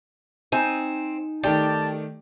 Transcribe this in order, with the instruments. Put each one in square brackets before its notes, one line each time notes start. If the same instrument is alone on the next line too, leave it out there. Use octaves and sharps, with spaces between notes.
[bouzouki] C4 [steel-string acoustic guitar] D#4 G#5
[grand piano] D#3 A3 D5 [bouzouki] G4 [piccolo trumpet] A5